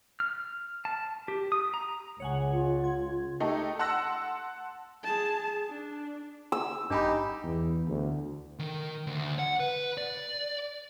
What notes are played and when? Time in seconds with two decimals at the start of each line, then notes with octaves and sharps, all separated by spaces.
0.20 F6
0.85 A5
1.28 G4
1.52 D#6
1.74 A#5
2.20 C#2 C#5 F#5 G#5
2.51 F4
2.84 G#6
3.40 A3 D#4 G4 A4
3.79 F#5 A5 C6 E6 F#6 A#6
5.04 G#4 A5
5.69 D4
6.52 E6
6.90 G#1 G2 D4 D#4 G4 G#5 B5
7.43 E2
7.87 D2
8.59 D#3
9.07 D2
9.39 F#5
9.60 B4
9.98 D5